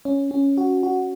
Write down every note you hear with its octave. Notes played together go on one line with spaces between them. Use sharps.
C#4
C#4
F#4
F#4